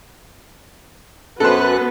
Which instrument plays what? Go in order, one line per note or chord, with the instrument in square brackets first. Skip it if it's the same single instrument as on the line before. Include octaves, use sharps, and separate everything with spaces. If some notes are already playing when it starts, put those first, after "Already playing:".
[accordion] F#2 F#6 [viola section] B3 F#4 B4 [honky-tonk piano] A4 C5